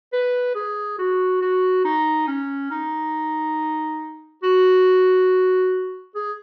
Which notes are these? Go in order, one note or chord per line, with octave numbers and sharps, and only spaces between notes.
B4
G#4
F#4
F#4
D#4
C#4
D#4
F#4
G#4